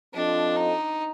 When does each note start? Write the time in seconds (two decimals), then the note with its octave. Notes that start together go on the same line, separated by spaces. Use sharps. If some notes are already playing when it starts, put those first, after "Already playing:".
0.14 F3 C4 D4 F4 A4 D#5
0.57 D#4